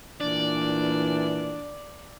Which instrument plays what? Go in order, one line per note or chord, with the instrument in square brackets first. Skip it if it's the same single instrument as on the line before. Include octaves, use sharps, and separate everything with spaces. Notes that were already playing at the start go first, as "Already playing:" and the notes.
[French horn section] A#2 E3 [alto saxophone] D4 [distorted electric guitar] D5